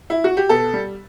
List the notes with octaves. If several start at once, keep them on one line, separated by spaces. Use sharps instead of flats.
E4
F#4
G4
B2 A4
G3